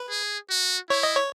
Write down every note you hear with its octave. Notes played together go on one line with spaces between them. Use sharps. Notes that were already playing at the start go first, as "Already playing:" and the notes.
Already playing: B4
G#4
F#4
E4 C#5
D#5
C#5